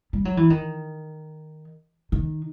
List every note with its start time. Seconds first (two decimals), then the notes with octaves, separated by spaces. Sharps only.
0.13 G3
0.25 F#3
0.37 E3
0.50 D#3
2.12 D#3